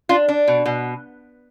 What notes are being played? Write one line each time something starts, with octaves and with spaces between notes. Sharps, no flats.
D4 F4
D4
B2
B2